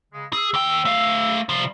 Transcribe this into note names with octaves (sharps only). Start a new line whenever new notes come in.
C#3 G#3
G#4 E6
D#2 G5
A3 F5
C3 F3 G3 C6